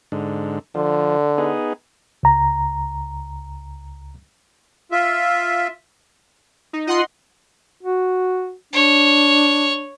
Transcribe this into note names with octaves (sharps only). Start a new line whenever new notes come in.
G#2 D3
D3 F3
B3 D#4 G#4
C#2 A#5
F4 E5
D#4
F4 D#5 F#5 C6
F#4
D4 C#5